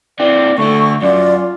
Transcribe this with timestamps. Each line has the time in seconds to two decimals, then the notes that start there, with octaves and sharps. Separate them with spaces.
0.20 E3 C4 D5
0.58 D2 D3 A3 C#6
1.02 F#2 F4 D5